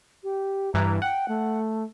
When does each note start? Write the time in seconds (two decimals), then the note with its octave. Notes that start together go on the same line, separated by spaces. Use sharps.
0.24 G4
0.74 G2 E3 A#5
1.02 F#5 G5
1.28 A3